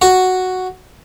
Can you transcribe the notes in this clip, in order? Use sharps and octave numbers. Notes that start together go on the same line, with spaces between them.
F#4